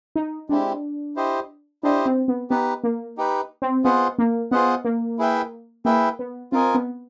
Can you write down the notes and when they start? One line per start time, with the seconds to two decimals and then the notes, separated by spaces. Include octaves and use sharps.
0.16 D#4
0.49 G#3 C4 D4 E4 G4
1.16 E4 G4 C5 D#5
1.83 D4 E4 G4 C5 D#5
2.06 C4
2.28 B3
2.50 B3 D#4 G4 B4
2.84 A#3
3.18 D#4 G4 B4
3.62 C4
3.84 B3 F4 G#4 C5 D#5 F#5
4.18 A#3
4.51 B3 F4 G#4 C5 D#5 F#5
4.85 A#3
5.19 E4 G#4 B4 E5 G5
5.85 A#3 E4 G#4 B4 E5 G5
6.19 B3
6.52 C4 F4 A#4 D#5 G#5
6.75 B3